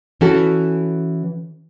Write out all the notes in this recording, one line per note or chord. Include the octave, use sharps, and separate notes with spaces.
E3 C#4 F#4 A4